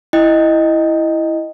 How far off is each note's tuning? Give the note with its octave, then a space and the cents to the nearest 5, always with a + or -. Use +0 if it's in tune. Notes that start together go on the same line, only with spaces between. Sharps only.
E4 +0 D#5 -5 G5 +15